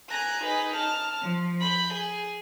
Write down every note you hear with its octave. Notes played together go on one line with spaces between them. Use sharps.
G#5 A#5 F#6
D#4 G#4 B4
A5 F6
F3
B5 G6
G#4